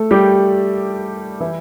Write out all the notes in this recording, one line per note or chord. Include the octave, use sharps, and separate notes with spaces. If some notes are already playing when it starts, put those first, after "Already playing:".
Already playing: A3 A4
G3 G4
E3 E4